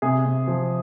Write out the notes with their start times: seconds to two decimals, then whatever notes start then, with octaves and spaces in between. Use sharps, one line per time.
0.02 C3 G#4
0.25 C3
0.47 F3